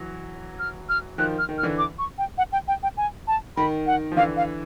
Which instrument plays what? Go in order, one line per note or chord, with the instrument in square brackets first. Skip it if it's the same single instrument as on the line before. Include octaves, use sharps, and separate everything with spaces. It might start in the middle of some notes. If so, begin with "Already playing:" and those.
Already playing: [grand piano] E3 F#3
[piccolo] F6
F6
[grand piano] D#3 F3 [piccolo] F#6
[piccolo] F6
[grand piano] D#3
[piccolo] F6
[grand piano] D3 E3
[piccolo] D6
C#6
G5
F#5
G5
G5
G5
G#5
A5
[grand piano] D#3 [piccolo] B5
[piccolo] F#5
[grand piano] F3
[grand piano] D3 E3 [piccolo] F5
[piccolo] F5